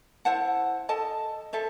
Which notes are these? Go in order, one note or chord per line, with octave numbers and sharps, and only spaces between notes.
E4 C5 F#5 A5
A4 D#5 A5
A4 C5 E5